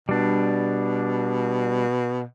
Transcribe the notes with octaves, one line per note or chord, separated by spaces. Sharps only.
B2 G3 D4